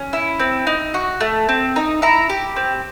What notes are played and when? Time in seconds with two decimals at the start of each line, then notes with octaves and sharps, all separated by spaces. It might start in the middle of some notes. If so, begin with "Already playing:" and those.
Already playing: C#4
0.13 E4
0.40 C4
0.67 D#4
0.94 F#4
1.21 A3
1.49 C4
1.76 D#4
2.02 E4 A#5
2.30 G4
2.56 C4